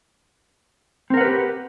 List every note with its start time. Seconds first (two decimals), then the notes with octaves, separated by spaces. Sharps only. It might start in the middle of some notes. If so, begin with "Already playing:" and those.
1.10 C4
1.14 A#4
1.17 F#5
1.21 B4
1.24 G4